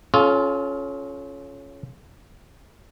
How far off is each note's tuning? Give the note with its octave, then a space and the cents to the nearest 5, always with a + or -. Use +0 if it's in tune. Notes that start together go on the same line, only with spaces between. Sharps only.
C#4 +0 F4 +0 A4 -45